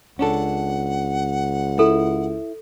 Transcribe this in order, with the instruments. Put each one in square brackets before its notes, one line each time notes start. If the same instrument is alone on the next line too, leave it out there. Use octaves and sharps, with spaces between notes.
[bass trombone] C#2 [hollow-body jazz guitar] C#4 D4 A4 [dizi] F#5
[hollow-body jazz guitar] E4 [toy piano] A4